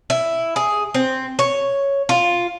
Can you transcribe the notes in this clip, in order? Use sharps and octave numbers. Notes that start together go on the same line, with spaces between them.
E4
G#4
C4
C#5
F4